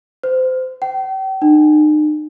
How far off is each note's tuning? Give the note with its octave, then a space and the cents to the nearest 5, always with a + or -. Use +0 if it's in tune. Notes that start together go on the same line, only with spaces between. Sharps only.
C5 -25
G5 -40
D#4 -40